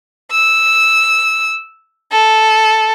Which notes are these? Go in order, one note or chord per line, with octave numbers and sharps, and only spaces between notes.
E6
A4